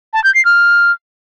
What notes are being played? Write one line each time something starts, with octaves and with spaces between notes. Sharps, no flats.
A5
G6
C7
F6